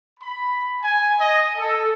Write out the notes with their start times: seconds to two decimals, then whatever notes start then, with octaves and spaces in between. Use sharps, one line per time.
0.19 B5
0.82 G#5
1.18 D#5
1.56 A4